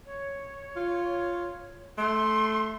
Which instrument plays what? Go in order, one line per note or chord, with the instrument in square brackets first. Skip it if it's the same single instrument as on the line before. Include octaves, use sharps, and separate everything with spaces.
[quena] C#5
[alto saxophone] F4
[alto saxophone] A3 [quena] C6